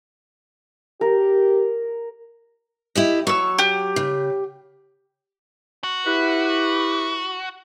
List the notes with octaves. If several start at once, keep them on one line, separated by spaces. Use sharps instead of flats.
G4 A#4
E4 G4 D#5
F#3 C#6 E6
G4
C#3
F#4
E4 G4 B4